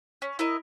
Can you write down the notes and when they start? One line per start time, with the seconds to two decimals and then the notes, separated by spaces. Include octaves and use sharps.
0.22 C#4
0.39 E4 A#4 D#5